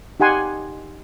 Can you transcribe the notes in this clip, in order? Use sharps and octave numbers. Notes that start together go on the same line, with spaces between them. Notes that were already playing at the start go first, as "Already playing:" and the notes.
D#4 G4 F#5 G#5 C6